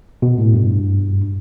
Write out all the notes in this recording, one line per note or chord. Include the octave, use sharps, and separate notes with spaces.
B2
A2
G2